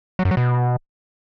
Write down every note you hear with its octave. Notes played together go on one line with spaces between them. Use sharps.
F#3
F#2
F#3
B2